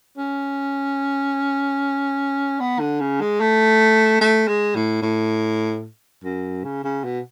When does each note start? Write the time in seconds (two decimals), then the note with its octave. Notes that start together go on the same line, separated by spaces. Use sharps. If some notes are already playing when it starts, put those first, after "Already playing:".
0.18 C#4
2.60 B3
2.80 D3
3.00 C#3
3.21 G#3
3.41 A3
4.21 A3
4.48 G#3
4.75 A2
5.02 A2
6.24 F#2
6.64 C#3
6.84 C#3
7.04 B2